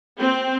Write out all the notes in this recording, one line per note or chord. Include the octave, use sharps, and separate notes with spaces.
C4